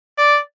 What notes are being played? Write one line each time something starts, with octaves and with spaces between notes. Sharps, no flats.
D5